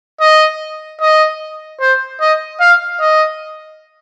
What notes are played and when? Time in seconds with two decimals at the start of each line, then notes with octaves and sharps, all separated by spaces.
0.21 D#5
1.01 D#5
1.81 C5
2.21 D#5
2.60 F5
3.00 D#5